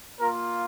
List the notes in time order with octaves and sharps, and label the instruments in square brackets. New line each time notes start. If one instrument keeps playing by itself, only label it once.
[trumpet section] A#3 F4 A#4